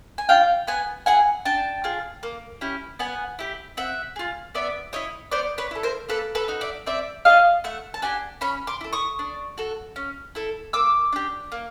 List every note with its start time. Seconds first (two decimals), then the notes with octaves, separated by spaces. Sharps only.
0.18 G#5
0.29 D4 F4 F5 G5
0.67 B3 F#5 G#5
1.06 E4 G#4 F#5 G#5
1.45 D4 G5 A5
1.84 F4 G#4
2.23 A#3
2.61 C#4 E4 G4
2.99 B3 F#5 G#5
3.39 E4 G4
3.77 C4 E5 F#5
4.16 F4 G#4
4.54 B3 D5 E5
4.93 E4 G4 C#5 D#5
5.31 B3 C5 D5
5.58 B4 C#5
5.71 E4 A4
5.83 A#4 C5
6.09 A#3 A4 B4
6.35 A4 B4
6.48 D#4 F#4
6.61 D5 E5
6.86 C4 D5 E5
7.25 G#4 D#5 F5
7.30 F4
7.64 A3 E5 F#5
7.94 A5
8.02 D4 G4 F#5 G#5
8.41 C#4 B5 C#6
8.67 C6 D6
8.81 E4 A4
8.93 C#6 D#6
9.19 D4
9.58 F#4 A4
9.96 C#4
10.35 E4 A4
10.73 A#3 D6 E6
11.12 D4 G4
11.52 A#3